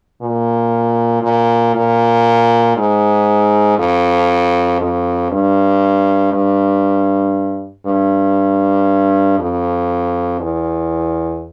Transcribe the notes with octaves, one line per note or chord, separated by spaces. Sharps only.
A#2
A#2
A#2
G#2
F2
F2
G2
G2
G2
F2
E2